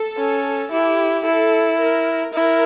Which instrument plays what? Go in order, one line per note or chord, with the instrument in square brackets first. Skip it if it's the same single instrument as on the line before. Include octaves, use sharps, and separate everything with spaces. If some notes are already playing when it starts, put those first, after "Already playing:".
Already playing: [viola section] A4
[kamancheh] C#4
[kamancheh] E4 [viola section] G4
[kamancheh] E4 [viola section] A4
[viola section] A#4
[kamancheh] E4 [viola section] A#4